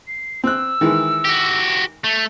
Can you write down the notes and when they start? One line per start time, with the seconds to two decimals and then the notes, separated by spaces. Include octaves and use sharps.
0.07 C7
0.44 C4 E6 F#6
0.81 D#3 E3 G#3
1.25 F#4 G4
2.04 A3 F7